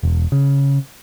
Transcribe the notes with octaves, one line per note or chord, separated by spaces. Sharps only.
E1
C#3